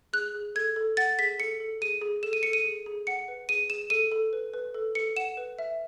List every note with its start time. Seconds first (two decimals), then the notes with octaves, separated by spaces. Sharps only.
0.13 G#4 F#6
0.34 G#4
0.55 A4 G#6
0.76 A4
0.97 F#5 A6
1.18 G#4 B6
1.39 A4 C#7
1.60 A4
1.81 G#4 D#7
2.02 G#4
2.23 A4 E7
2.33 D#7
2.43 A4 C#7
2.53 D#7
2.64 G#4
2.86 G#4
3.07 F#5 C#7
3.28 B4
3.49 G#4 D#7
3.70 G#4 E7
3.90 A4 D#7
4.12 A4
4.33 B4
4.54 B4
4.74 A4
4.95 A4 C#7
5.16 F#5 E7
5.37 B4
5.59 E5